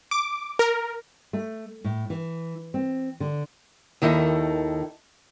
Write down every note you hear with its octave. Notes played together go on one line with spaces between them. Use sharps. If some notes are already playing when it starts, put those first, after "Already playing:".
D6
A#4
A3
A2
E3
C4
D3
D#2 D#3 E4 A4 D#5